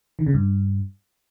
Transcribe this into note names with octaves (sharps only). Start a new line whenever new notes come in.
D#3
C#3
G2